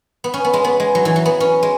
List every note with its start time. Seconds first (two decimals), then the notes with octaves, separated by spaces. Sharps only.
0.24 B3
0.34 C#4
0.44 B3
0.53 G#3
0.64 B3
0.80 G#3
0.95 F#3
1.05 E3
1.16 F#3
1.25 B3
1.40 C#4
1.63 G#3